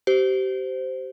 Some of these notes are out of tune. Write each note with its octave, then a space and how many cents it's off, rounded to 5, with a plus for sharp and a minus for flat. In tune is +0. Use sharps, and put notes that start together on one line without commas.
G4 -30 C5 -10